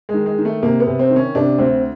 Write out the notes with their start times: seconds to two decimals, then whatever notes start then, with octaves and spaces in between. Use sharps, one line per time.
0.09 G#3
0.14 D#3
0.26 G#3
0.39 D#3
0.45 A3
0.63 C3 A#3
0.80 B3
0.87 C3
0.99 C4
1.10 D#3
1.16 C#4
1.35 C3 D4
1.58 D2 C4